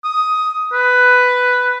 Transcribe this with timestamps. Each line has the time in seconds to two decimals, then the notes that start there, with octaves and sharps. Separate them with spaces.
0.04 D#6
0.73 B4